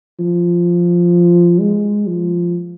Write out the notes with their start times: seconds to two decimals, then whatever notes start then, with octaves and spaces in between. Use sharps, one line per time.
0.19 F3
1.60 G#3
2.07 F3